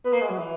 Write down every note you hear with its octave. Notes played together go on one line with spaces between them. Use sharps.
B3
A#3
G#3
F#3
E3